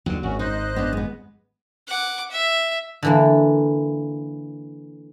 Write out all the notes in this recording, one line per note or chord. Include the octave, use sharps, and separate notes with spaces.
D#2 D3 F#3
G#1 C#4 F#4
D#4 C5 D#5 F#6
B3 D4
G#3 B3
F#5 D6
E5
D3 E3 A#3